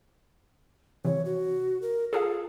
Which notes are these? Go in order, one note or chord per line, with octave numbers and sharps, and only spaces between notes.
C3 E3 C#5
F#4
A#4
F4 G#4 A4 F5